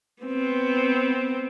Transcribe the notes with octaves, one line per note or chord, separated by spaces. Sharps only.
B3 C4